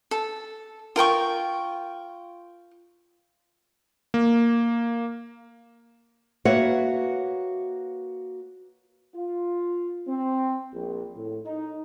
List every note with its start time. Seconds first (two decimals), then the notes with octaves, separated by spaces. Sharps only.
0.11 A4
0.96 F4 A#4 G5 C#6
4.14 A#3
6.45 A#3 F#4 B4 C#5 E5 F#5
9.15 F4
10.07 C4
10.73 A#1
11.15 A2
11.45 D#4